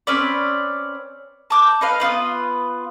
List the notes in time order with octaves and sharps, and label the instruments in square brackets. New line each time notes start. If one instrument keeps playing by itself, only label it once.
[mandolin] C4 C#4 B4 D5
A5 D6 G6
D#4 B4 F5
B3 C#4 F4 B4